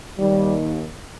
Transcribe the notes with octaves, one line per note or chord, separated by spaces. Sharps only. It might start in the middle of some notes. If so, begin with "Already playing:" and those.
D#2 D#3 G3